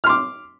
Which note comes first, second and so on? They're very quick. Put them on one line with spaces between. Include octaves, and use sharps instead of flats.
F6 C6 D6